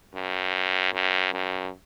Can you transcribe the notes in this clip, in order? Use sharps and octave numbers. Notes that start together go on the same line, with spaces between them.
F#2
F#2
F#2